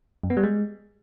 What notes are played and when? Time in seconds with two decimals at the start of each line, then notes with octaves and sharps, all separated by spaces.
0.23 F#2
0.30 B3
0.37 G3
0.43 G#3